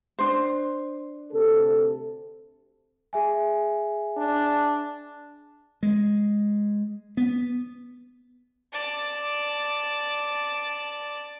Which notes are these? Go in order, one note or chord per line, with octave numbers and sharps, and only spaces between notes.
D4 C5
D2 C3 A4
G#4 E5 G#5
D4
G#3
B3
D5 A5